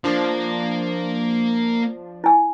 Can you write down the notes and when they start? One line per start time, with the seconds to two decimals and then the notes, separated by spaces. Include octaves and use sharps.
0.04 F3 A#3 D4
2.24 E4 G#5